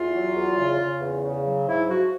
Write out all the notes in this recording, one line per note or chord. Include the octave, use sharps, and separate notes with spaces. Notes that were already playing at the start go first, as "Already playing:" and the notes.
Already playing: E2 F4
F#3
E2
C#3
C#3
E2
C#3
F#3
G#2 E4
F3 F#4